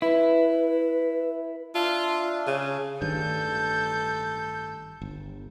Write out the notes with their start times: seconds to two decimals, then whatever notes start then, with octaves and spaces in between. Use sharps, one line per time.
0.02 E4 B4
1.75 D4 F4 E5
2.47 C#3
3.02 A1 G2 D#3 A4 G6
5.02 G1